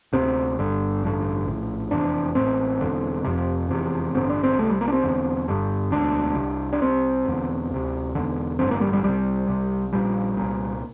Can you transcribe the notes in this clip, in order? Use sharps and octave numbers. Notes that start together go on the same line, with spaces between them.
D2 C3 C4
G1 G2 D3
A1 G2 D3
A#1 A2
F1 E2 C3 D4
A1 A2 C4
E1 E2 D3
F1 F2 C3
F1 E2 C3
A1 G2 D3 C4
D4
C4
C2 C3 A3
G3
A#3
D4
C4
E1 E2 D3
G1 G2 D3
E1 D2 D3 D4
C2 C3
D4
C2 C3 C4
E1 E2 D3
D2 C3
E1 E2 D3
A1 G2 D3 C4
A#3
G3
G3
C2 C3 G3
C2 C3
A#1 A#2 G3
C2 A#2